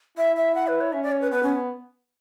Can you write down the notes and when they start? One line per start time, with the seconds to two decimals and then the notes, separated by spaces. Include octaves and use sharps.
0.17 E4 E5
0.36 E5
0.55 F#5
0.67 B4
0.81 C#5
0.93 C#4 E5
1.03 D5
1.12 C#5
1.21 B4
1.31 B3 B4
1.43 C#4